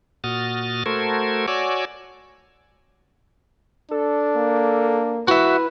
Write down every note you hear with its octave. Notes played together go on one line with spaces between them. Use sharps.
A#2 F#4 D#6 F6 A6
A3 F#4 A4 A#4 C5 G#6
F#4 C#5 D5 G#5 D6 E6
D4 A4
A#3
E4 F#4 B4 E5